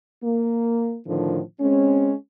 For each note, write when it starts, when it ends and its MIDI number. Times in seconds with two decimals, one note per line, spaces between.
0.23 0.98 58
1.08 1.41 45
1.08 1.41 50
1.08 1.41 51
1.08 1.41 53
1.61 2.13 56
1.61 2.13 60
1.61 2.13 61